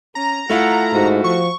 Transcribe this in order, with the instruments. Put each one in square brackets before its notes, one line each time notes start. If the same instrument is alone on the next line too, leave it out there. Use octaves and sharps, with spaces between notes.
[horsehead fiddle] C#4 [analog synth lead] A#5
[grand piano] A3 E4 F4 [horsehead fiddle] F#5
[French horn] G#2 [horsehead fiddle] F#4
[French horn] F3 [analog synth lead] C#6